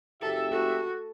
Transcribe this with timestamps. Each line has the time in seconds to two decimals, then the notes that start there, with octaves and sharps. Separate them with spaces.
0.22 F#1 G4 A4 E5
0.51 F#4 A4